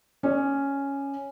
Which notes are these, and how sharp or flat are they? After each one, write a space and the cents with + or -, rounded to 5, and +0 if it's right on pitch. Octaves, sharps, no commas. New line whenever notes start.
C#4 +0 D5 +30